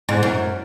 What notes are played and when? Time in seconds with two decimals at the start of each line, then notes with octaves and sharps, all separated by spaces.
0.09 G#2
0.23 F#2